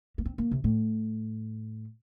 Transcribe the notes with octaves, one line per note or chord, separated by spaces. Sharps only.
A#3
C4
A#3
C3
A2